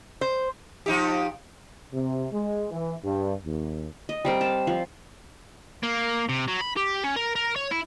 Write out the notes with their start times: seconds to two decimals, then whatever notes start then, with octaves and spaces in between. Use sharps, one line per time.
0.21 C5
0.86 F3 D#4 G4
1.94 C3
2.33 G#3
2.70 E3
3.04 G2
3.46 D#2
4.09 D#5
4.25 G3 C4 A#4
4.41 A5
4.67 F3
5.83 A#3
6.29 C3
6.48 F#3
6.61 B5
6.77 G4
7.04 C#4
7.16 A#4
7.36 A#4
7.56 C#5
7.71 E4